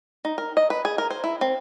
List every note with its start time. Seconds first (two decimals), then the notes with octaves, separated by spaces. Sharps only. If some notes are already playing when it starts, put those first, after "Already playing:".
0.25 D#4
0.38 A#4
0.57 D#5
0.70 B4
0.85 G#4
0.98 A#4
1.10 C5
1.24 E4
1.41 C4